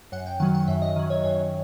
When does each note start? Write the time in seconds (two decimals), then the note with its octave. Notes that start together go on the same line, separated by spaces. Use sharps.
0.12 F#2 F#5
0.26 G5
0.40 D#3 F#3 F#5
0.55 F#5
0.68 F#2 E5
0.82 D#5
0.96 D#3 F#3
1.10 C#5
1.24 F#2 C#5